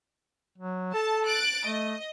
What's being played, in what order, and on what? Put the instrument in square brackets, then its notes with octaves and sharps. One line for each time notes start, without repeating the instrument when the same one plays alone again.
[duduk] F#3
[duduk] A4 [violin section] A5
[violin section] F#6 A6 D7
[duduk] A3 [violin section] D#5